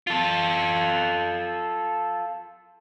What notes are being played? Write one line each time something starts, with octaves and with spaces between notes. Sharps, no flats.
F4 A4